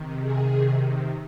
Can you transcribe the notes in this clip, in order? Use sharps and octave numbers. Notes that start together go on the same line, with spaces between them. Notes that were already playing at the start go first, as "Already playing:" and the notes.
Already playing: C3 D#3
G#4
C3 D#3